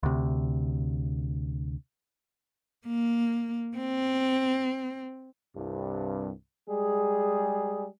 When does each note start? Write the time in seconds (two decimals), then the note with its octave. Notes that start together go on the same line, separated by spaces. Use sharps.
0.03 D2 C3
2.87 A#3
3.77 C4
5.56 C2 G2
6.69 G3 G#3 G#4